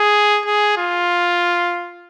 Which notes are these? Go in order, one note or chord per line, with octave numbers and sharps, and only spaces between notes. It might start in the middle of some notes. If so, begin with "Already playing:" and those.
Already playing: G#4
G#4
F4